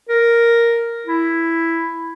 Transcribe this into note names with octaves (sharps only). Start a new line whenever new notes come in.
A#4
E4